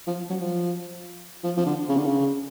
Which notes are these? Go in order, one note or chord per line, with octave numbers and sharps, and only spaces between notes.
F3
F#3
F3
F3
F3
D3
C#3
D3
C#3